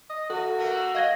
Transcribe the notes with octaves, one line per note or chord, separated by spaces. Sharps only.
D#5
A3 F#4 A4
A3 A#3 A#4
D#5 F5 G#6 A#6